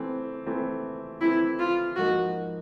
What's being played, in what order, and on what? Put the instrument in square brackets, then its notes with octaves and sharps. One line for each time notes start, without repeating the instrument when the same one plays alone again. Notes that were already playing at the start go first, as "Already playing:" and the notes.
Already playing: [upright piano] E3 A3 C4
E3 A3 C4
[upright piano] E3 A3 C4 [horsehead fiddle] E4
[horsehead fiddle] F4
[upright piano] G#2 F3 A#3 D#4 [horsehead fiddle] F#4